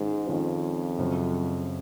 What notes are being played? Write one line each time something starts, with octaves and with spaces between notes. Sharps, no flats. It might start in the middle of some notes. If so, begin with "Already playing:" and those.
Already playing: G#2 D#3 G#3 C#4 F4
F2 D#3 G#3 C#4 F4
F#2 C#3 F#3 C4